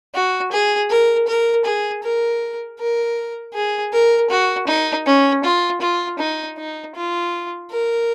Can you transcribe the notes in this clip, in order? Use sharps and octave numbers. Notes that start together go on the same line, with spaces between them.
F#4
G#4
A#4
A#4
G#4
A#4
A#4
G#4
A#4
F#4
D#4
C#4
F4
F4
D#4
D#4
F4
A#4